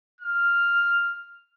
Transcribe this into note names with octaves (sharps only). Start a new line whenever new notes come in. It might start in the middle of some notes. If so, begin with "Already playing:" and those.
F6